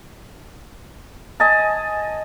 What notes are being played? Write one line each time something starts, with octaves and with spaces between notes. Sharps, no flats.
D#5 G#5 A5